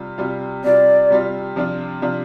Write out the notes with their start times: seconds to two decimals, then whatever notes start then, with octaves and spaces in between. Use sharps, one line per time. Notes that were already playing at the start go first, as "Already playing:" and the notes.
Already playing: C3 G3 F4
0.18 C3 G3 F4
0.64 C3 G3 F4 D5
1.10 C3 G3 F4
1.56 C3 F3 D4 F4
2.02 C3 F3 D4 F4